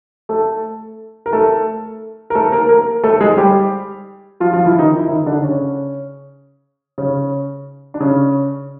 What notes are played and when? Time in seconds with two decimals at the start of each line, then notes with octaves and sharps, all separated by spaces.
0.29 A3 A4
1.26 A#4
1.33 A3 A4
2.30 A#4
2.35 A3 A4
2.52 A#3 A#4
2.69 A#3 A#4
3.04 A3 A4
3.21 G#3 G#4
3.38 G3 G4
4.40 F3 F4
4.53 F3 F4
4.66 E3 E4
4.79 D#3 D#4
4.98 E4
5.09 D#3 D#4
5.26 D3 D4
5.44 C#3 C#4
6.98 C#3 C#4
7.94 D4
8.00 C#3 C#4